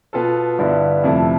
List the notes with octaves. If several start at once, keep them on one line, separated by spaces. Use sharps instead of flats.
B2 B3 F4 A4
G2 D3 G3 B3 E4
F2 C3 F3 A3 E4